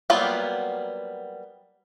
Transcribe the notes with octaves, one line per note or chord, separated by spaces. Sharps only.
F#3 G3 A#3 B3 F4